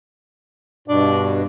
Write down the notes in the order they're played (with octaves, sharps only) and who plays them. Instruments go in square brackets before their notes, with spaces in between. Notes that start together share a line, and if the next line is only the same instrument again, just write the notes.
[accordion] G2 B2 [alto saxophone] D4